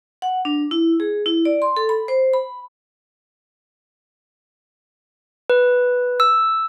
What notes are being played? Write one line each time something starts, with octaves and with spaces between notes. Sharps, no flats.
F#5
D4
E4
G#4
E4
D5
C6
A4
B5
C5
B5
B4
E6